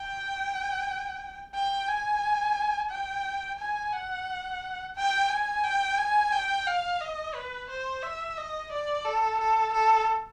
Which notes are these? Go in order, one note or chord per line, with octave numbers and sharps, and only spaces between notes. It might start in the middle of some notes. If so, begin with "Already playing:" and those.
Already playing: G5
G5
G#5
G5
G#5
F#5
G5
G#5
G5
G#5
G5
F5
D#5
B4
C5
E5
D#5
D5
A4
A4
A4